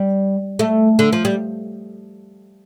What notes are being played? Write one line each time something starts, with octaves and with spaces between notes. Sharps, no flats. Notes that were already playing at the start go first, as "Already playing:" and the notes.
Already playing: G3
A3
D3
F3
G3